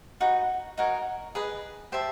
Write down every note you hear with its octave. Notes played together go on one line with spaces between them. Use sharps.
D#4 F#4 B4
D#4 F#4 A#4 C#5
G#4 B4 D#5
G4 C5 E5 A5